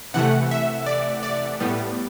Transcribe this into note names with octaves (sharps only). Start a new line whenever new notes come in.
C3 E3 A3 F#5
E5
D5
D5
A2 G3 B3